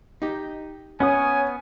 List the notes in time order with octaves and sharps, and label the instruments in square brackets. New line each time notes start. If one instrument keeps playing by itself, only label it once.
[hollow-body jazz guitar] D#4 G4
[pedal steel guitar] B3 F#5 D#6 [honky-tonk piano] C#4 [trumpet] G#5